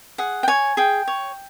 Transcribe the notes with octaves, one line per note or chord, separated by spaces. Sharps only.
G#4 F#5
G5
C#5 G#5
G#4 G5
C#5